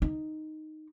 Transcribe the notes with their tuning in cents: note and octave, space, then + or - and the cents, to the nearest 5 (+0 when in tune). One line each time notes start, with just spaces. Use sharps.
D#4 -5